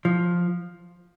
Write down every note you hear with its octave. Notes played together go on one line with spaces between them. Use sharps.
F3